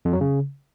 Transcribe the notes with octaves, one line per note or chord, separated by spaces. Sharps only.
F2
F#3
C#3